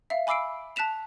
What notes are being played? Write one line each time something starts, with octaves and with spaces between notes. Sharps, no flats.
E5 F5
G#5 B5 D6 E6 C7 D7
A5 F#6 B6 E7 F7